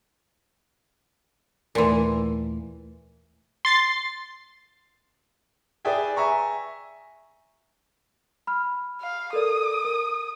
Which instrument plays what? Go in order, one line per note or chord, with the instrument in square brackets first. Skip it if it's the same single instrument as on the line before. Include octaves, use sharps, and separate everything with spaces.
[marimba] D#2 A3 C6 [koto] A#2 E3
[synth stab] C6 A6 C7
[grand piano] G#4 B4 D5 E5 G5 G#5
E5 G#5 A#5 C#6
[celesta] B5 F6
[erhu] F5
[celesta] A4 A#4 D5 [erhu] D#6
[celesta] A#4